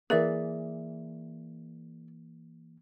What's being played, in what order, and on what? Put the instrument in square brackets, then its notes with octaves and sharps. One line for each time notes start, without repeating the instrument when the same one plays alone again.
[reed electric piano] E3 A#3 [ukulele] G#4 D5 E5 [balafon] A#4